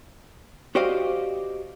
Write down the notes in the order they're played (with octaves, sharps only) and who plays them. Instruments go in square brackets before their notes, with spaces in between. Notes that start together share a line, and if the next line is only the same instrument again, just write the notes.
[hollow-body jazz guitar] F#4 G4 C5 D5 D#5 F5